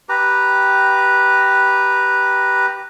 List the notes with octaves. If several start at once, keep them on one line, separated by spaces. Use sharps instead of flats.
G4 B4 A#5